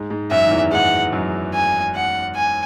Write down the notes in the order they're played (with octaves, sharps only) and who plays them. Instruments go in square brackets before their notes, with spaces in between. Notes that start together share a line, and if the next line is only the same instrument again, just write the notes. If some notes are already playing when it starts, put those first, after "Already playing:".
Already playing: [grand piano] G#2 G#3
G#2 G#3
[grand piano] F#2 F#3 [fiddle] E5
[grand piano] D#3
E2 E3
[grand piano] G#2 G#3 [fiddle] F#5
[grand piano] F#2 F#3
[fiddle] G#5
F#5
G#5